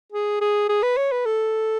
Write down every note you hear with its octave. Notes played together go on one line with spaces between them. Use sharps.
G#4
G#4
G#4
B4
C#5
B4
A4